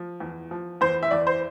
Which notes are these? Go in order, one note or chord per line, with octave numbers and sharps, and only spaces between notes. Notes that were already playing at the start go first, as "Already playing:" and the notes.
Already playing: F3
E2
F3
E2 C5
E5
E2 D5
C5